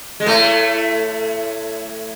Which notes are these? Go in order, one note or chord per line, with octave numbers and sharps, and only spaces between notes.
G#3
A2 A3